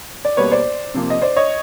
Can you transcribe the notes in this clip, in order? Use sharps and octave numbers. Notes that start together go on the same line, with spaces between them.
D5
B2 G3 A#3 B4 C#5
C5 D5
C3 F3 A#3
D#5
C5 D5
C#5 D#5